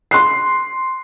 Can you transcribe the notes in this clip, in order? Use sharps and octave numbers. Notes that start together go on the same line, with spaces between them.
C6 F#6 C7